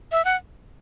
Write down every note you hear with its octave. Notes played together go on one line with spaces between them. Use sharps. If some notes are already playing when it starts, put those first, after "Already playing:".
E5
F#5